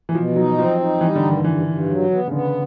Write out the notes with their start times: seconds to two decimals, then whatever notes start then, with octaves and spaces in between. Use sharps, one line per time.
0.09 E3
0.15 B2 F3
0.36 F#3 D#4
0.58 F3 C4
0.80 D#4
1.01 E3 G3
1.15 D3
1.23 G2
1.30 D#3
1.44 G2 E3
1.67 G2
1.88 F#3
2.10 B3
2.28 C#3
2.32 D3 B3